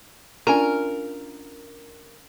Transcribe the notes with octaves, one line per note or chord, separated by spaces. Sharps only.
C#4 D4 F4 A#4 D5 G#5